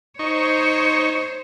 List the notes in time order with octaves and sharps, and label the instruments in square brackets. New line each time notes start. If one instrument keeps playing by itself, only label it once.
[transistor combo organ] D#4 C#6 [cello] C5 C#5